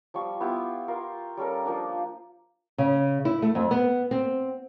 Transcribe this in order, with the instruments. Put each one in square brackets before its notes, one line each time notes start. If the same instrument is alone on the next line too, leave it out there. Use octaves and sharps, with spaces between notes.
[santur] F3 G3 C#6
B3 E4 F4 G4
F4 A#4 F5
G3 C#4 A4 A#4
F3 A#3 D4
[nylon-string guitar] C#3
E4
A3
F2
B3
C4